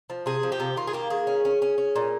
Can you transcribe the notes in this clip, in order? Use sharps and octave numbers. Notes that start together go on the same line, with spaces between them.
F3
C3 G#4
F3
G4
C3
D#3 F4
G#4
A#3 G4
D#3 G#4
C#4
C#4
C#4
C#4
A#2